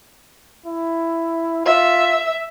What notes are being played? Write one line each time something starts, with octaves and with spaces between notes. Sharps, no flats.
E4
F4 E5